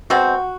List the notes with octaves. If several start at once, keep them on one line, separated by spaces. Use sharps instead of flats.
B2 G#3 C4 F#4